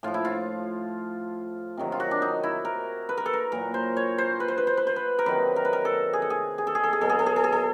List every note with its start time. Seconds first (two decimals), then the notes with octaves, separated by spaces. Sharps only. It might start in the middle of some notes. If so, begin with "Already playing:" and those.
0.03 A2 F3 F4
0.14 E4
0.25 F4
1.77 C3 D#3 F#3
1.92 F4
2.00 F#4
2.11 D4
2.22 D#4
2.43 E4
2.65 A#4
3.09 B4
3.17 A#4
3.26 A4
3.33 A#4
3.52 A#2 F#3 A#4
3.74 C5
3.97 C#5
4.18 C5
4.40 B4
4.48 C5
4.58 B4
4.67 C5
4.77 B4
4.87 C5
4.96 B4
5.19 A#4
5.26 C3 D#3 F#3 B4
5.56 A#4
5.65 B4
5.73 A#4
5.85 A4
6.13 G#4
6.22 A4
6.30 G#4
6.58 G#4
6.67 A4
6.75 G#4
6.84 A4
6.93 G#4
7.01 B2 F#3 A4
7.09 G#4
7.19 A4
7.26 G#4
7.36 A4
7.44 G#4
7.52 A4